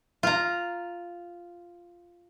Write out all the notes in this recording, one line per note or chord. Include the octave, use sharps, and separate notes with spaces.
F4 A#5